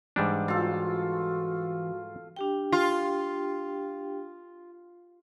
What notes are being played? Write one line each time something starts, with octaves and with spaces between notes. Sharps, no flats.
G#2 E3 G3 D4
F4 F#4 A4
D4 G4 G5
F4